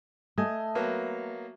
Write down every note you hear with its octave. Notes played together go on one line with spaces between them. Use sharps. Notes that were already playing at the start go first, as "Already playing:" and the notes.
A3 D#5 G#5
F#3 A#3 B3